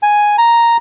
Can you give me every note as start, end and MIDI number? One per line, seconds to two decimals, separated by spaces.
0.03 0.36 80
0.38 0.77 82